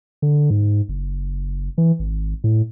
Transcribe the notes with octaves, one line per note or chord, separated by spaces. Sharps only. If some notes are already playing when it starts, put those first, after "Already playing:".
D3
G#2
F#1
E3
G#1
A2